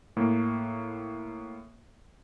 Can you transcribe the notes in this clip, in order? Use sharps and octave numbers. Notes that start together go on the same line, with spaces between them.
A2 A#3